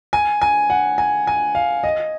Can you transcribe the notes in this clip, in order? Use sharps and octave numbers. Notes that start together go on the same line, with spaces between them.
G#5
G#5
F#5
G#5
G#5
F5
D#5